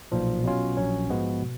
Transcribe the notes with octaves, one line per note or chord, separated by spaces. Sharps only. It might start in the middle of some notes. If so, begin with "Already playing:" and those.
B1 A#2 F3
B2 F#3 C#4 F4
A#1 A#2 F#3 C#4
G#2 F3 G#3 B3 F#4
B2